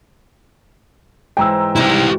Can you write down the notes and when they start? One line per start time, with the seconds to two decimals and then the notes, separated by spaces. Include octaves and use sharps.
1.37 G#2 E3 C5 G5 A#5 E6
1.76 C3 G3 D#4 E4 G4